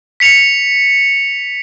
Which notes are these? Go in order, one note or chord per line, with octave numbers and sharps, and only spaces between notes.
B6 C#7 F7